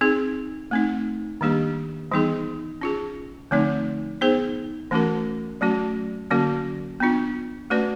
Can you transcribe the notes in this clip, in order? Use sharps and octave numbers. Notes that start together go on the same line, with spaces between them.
C4 D#4 G#4
A3 C4 D#4
D#3 G3 A#3 D4 G4
E3 G3 B3 D#4 G#4
C#4 F4 G#4
D3 F3 A3 C4 D#4
B3 D#4 G#4 C5
E3 A3 C#4 F#4 A#4
F#3 A3 C#4 F#4
D3 F#3 A#3 C#4 F#4
B3 D4 F4
A3 C#4 F#4 B4 D5